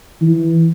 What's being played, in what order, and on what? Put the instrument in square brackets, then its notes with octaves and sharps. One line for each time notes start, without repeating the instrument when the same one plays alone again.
[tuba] E3